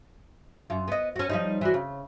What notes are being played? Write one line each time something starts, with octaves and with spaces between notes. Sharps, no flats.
F#2 F4
B3 D#5
C#4 F#4
F3 G3 D#4
E3 D4 F#4
C#3